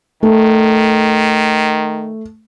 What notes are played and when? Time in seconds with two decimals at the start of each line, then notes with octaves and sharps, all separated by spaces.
0.23 D#3 A3